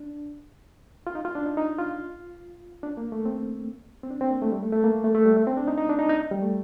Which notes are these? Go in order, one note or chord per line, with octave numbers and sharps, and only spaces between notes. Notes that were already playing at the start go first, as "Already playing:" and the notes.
Already playing: D4
F4
D#4
F4
D4
D#4
D#4
F4
D4
A#3
A3
C4
C4
D4
C4
A#3
A3
G3
A3
A3
A#3
A3
A3
G3
A3
C4
D4
D#4
D#4
D4
D#4
D#4
G3
A3